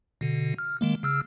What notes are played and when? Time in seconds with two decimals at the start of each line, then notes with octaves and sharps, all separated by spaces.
0.21 B2 D3
0.58 F6
0.81 D#3 G#3 A#3
1.03 C#3 E6 F6